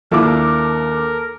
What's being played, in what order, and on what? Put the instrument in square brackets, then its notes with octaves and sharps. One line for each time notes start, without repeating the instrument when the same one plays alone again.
[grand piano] D#2 [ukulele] D4 E4 F4 [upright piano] A4 D6 [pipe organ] A#4